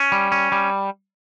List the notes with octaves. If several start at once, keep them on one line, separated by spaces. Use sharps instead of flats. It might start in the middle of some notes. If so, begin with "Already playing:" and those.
Already playing: C#4
G3
C#4
G3